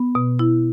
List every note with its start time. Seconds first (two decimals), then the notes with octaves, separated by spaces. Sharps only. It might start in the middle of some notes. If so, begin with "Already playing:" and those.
Already playing: B3
0.15 B2
0.39 E4